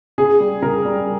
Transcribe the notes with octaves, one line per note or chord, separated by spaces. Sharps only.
C#3 G#4
G3
C#3 A#4
G3